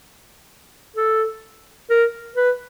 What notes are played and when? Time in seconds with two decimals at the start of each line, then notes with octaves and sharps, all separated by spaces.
0.96 A4
1.90 A#4
2.36 B4